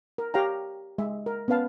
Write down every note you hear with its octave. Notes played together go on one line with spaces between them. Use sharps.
A#4
G4 C#5 F5 G5 A#5
G#3 E5
A#4
B3 C#4 B4 F5 A5